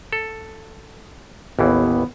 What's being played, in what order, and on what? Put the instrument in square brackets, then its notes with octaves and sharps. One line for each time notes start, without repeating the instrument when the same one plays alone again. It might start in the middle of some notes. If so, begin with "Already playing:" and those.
[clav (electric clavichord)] A4
[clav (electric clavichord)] A1 D#2 E3 [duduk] B3